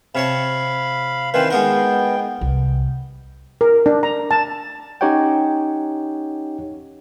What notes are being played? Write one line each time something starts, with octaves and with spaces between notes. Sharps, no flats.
C3 C#5 F5 A5 B5
D#3 E3 C4 B4 C5 F5
G#3 B3 D#4 A#4 G5
C2
A#4
D4
A#5
A5
C#4 D#4 G4 C#5 F#5 G5